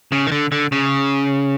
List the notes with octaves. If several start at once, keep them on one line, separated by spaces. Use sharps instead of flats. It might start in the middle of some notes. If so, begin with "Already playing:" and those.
C#3
D#3
D3
D3
C#3